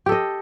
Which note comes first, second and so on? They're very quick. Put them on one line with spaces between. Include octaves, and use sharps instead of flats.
G4 A4 D#5